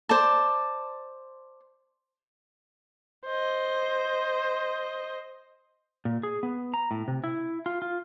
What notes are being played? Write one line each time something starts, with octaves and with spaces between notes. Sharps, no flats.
C5 D5 A5
C5 D#5
A#2
G#4
B3
A#5
A2
C3
E4
F4
F4